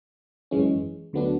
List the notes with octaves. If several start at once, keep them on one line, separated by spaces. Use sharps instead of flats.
G#1 F#2 E3 G#3 C#4
D2 D3 F#3 B3 D4